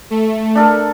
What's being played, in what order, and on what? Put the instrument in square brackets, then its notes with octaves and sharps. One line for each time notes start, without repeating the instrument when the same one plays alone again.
[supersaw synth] A3
[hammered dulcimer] D4 A4 A#4